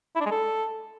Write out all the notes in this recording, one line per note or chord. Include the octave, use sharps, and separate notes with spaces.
E4
D4
G#3
A4